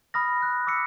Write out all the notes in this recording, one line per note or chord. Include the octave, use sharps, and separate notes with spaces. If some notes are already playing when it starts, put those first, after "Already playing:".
B5 D#6 F6 A#6
F#6
D6 E6 B6 C#7